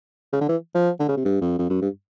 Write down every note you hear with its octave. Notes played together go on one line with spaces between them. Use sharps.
C#3
D3
E3
F3
D3
C#3
C3
G2
F2
F2
F#2
G2